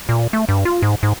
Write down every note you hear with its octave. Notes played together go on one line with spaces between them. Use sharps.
A#2
A3
G2
F4
G#2
G#2